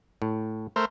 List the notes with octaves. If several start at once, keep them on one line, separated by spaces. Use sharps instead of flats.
A2
A3 A#4 C5